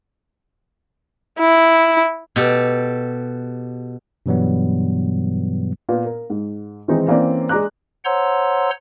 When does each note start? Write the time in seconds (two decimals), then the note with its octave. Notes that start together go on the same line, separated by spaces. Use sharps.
1.39 E4
2.36 B2 G4 A4
4.26 G2 B2 E3 F#3 G3 B3
5.89 A#2 B3
6.05 A#4
6.30 G#2
6.88 D#3 E3 G#3 C4 D#4
7.08 E3 A#3 C4 C#4 D5
7.49 G#3 D5 A#5 D6 F#6
8.05 C5 C#5 F#5 A#5 C6 E6